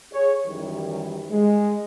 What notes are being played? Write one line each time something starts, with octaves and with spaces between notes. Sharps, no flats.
G#4 C#5
F#2 D#3 E3 G3
G#3